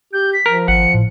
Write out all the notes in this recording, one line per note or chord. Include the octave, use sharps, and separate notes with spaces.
G4 G6
B6
F3 A#4
G#1 F#5 C#7
A2